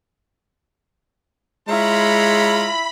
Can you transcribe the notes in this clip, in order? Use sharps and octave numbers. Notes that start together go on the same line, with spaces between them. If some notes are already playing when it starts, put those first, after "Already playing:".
G#3 E4 F4 C#5 A#5 B5